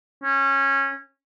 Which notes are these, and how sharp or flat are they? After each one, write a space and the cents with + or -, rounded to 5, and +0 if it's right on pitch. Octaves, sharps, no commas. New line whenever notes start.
C#4 -20